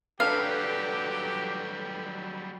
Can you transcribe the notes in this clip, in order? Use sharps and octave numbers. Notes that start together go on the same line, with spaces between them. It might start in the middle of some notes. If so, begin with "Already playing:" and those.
F#3 G3 D4 G4 A4 B4 F5